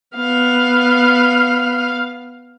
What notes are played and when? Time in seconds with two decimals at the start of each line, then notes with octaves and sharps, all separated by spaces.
0.16 B3 F5